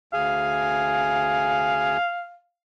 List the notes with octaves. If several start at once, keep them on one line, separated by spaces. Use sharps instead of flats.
D2 G#4 F5 G#5